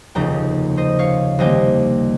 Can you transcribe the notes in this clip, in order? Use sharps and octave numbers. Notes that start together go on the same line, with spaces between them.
F1 D#2 C#3 G5 A#5
C5 D#5
C#5 F5
C2 C3 D#3 A#3 D#5 G5